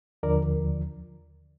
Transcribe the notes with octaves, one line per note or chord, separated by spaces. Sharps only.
D#2 D3 F3 A#4 D5